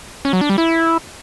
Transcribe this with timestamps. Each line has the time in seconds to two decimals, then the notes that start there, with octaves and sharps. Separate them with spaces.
0.25 C#4
0.33 F#3
0.41 D4
0.50 G3
0.58 E4